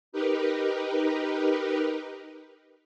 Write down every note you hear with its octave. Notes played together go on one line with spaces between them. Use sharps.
D#4 G4 A#4 B4